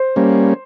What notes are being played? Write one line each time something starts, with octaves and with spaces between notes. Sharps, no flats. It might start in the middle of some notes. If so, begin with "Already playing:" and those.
Already playing: C5
G3 A#3 C#4